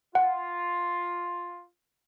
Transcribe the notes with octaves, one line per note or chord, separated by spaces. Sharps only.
F4 F#5